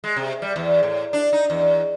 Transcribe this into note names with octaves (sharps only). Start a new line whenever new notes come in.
G#3
C3
G3
E2
A2
D4
D#4
E2